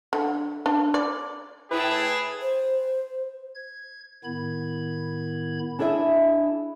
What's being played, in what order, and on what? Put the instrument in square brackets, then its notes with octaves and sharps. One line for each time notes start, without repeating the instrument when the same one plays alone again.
[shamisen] D3
D4
D5
[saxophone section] A2 E4 [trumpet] G#4 [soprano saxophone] B4 [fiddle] G5 A5
[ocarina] C5
[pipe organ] G#6
A2 D#3 B3 E4 B5 G#6
[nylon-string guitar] D4 E4 G#4 D#5 E5